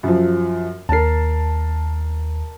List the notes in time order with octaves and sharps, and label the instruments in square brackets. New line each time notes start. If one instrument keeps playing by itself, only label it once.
[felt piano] F#2 F3
[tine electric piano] D#2 C7 [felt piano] A#4 A5